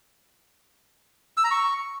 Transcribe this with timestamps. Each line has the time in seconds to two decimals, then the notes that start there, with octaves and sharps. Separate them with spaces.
1.37 E6
1.44 A#5
1.51 C#6